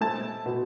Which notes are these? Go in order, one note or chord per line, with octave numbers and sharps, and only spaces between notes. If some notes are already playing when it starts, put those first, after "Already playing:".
A3 A5
B2